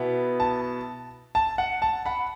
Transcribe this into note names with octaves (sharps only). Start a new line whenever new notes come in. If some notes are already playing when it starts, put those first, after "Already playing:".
Already playing: B2 B3 E4
A5
A5
F#5
A5
F#5 B5